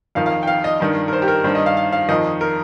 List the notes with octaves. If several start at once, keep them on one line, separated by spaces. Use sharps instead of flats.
F2 D#3 F5
F5
G5
F5
D#5
G2 D#3
A#4
C5
G4
A#4
G2 D#3 C5
D#5
F5
F5
F5
F2 D#3 D#5
A#4